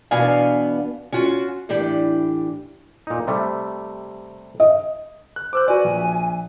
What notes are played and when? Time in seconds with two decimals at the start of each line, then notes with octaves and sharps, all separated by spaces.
0.11 E2 B2 B3 D4 F5 G#5
1.12 C#4 F4 F#4
1.69 A2 E3 D4 G4
3.07 A#2 D#4
3.27 C3 G3 A3
4.60 D#5
5.36 F#6
5.53 C5 D6 E6 F#6
5.68 F#4 B4 D5 G#5
5.84 A#1